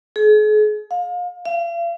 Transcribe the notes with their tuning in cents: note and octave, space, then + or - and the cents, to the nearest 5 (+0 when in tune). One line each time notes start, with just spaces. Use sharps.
G#4 +40
F5 +30
F5 -45